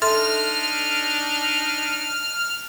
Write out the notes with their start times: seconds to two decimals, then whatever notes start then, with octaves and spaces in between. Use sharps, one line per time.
0.02 D4 D#4 A4 E5 C6 F6